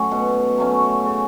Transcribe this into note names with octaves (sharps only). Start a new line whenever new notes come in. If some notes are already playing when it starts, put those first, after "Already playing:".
Already playing: F#3 A3 C#4
B2
F#3 A3 C#4
C#3